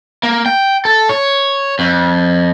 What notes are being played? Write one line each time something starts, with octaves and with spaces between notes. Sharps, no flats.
A#3
G5
A4
C#5
F2